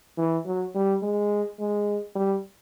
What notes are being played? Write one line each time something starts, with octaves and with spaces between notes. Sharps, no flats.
E3
F#3
G3
G#3
G#3
G3